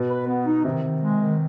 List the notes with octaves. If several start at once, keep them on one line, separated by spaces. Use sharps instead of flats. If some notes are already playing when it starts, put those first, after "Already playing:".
Already playing: B2
B4
B3
D#4
C3 D#3
D#3
G#3
D#3